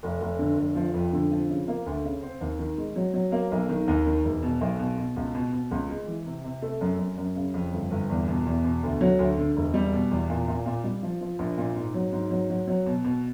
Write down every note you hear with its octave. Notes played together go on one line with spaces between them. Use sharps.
F1
F1
D3
F1
F3
F2
D3
F3
C#3
A#3
D2
C#3
C4
D#2
D#3
G#3
F#3
F#3
A#3
B1
D#3
D#2
D#3
E1
B2
B1
B2
B2
C#2
B2
B2
C#2
G#3
E3
C3
C3
A3
F#2
F#2
F#2
C#3
F2
G1
G1
E2
B2
E2
B2
D2
F#3
D2
D3
E1
G3
B2
E2
A#2
A#2
A#2
G3
F3
F3
A#1
A#2
G#2
F#3
G#2
F#3
F#3
F#3
B2
B2